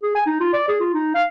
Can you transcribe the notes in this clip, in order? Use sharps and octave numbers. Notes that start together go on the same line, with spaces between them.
G#4
G#5
D#4
F4
D5
G#4
F4
D#4
F5